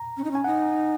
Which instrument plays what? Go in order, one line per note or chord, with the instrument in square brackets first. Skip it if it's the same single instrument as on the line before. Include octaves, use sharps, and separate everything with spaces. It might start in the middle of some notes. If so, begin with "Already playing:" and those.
Already playing: [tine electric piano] A#5
[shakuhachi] C#4
D#4
[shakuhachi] C#4 [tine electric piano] G#5
[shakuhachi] D#4 [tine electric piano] F#5